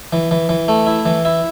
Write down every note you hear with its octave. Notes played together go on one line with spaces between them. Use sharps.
E3
E3
E3
A3
E4
E3
E4